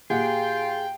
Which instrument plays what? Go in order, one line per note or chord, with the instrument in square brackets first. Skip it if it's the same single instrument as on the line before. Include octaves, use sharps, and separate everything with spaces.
[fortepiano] A#2 G4 F#5 [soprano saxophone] F4 [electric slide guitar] G#4 [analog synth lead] G5